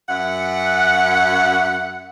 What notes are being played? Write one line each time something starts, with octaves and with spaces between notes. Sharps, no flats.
F#2 E5 F#5